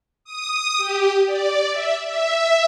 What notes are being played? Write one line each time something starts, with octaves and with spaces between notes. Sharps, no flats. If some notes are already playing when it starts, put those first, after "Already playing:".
D#6
G4
D5
E5
E5